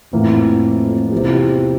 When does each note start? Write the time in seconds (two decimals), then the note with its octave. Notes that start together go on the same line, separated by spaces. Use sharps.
0.12 F2 A2 E3 A#3
1.12 E2 C3 F3 C4 E4 G4